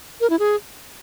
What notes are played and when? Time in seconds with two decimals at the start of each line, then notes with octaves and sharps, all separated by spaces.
0.21 A#4
0.30 E4
0.39 G#4